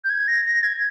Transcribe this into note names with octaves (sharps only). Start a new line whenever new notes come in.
G6
G#6
A#6
A#6
G#6